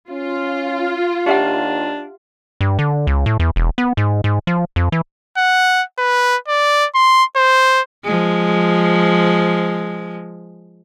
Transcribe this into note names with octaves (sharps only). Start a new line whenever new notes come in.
C#4 F4
D#2 D4 G4 E5 F#5
G2
D3
C#2
A2
E2
E1
B3
G#2
G#2
F3
F2
E3
F#5
B4
D5
C6
C5
F3 G#3